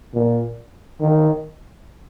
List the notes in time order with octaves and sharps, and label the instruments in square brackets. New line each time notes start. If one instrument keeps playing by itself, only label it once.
[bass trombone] A#2
D#3